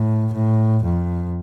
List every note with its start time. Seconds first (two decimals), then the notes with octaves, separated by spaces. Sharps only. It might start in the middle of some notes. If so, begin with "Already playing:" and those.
Already playing: A2
0.33 A2
0.83 F2